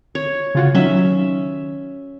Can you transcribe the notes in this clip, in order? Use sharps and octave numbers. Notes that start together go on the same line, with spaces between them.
C#5
C#3 F4 F#4
D#3 F#3 C#4 E5